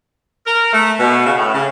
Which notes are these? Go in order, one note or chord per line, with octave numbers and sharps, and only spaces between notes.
A#4
A3
B2
C#3
A2
C#3